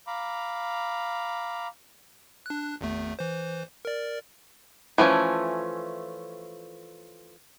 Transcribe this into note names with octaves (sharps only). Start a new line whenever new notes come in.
F5 A#5 B5 D6
D4 F#6
G#1 E2 A3
E3 C5
A#4 D5
E3 F3 A3 C#4